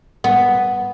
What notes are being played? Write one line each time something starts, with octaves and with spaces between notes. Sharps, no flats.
B3